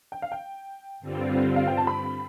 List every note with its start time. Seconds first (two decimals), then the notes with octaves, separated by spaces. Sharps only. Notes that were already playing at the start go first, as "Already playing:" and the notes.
0.12 G5
0.22 F5
0.32 G5
1.00 G2 D3 G3 C4 F4
1.56 F5
1.68 G5
1.77 A5
1.87 B5